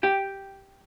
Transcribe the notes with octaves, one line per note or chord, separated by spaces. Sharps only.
G4 G5